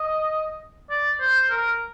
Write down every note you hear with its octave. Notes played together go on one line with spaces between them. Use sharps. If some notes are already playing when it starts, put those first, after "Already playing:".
Already playing: D#5
D5
C5
A#4